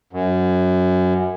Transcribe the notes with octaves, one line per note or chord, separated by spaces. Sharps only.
F#2